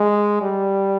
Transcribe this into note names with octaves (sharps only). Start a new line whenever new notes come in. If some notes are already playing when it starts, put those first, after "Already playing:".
Already playing: G#3
G3